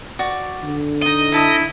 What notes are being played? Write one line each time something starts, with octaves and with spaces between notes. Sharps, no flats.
F#4 D5 C#6
D3
D#4 F4 D#5
D#4 E4 A5 D#6